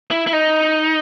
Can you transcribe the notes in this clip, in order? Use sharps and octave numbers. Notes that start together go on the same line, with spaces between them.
E4
E4
D#4